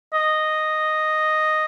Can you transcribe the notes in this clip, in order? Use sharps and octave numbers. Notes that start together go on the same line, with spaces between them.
D#5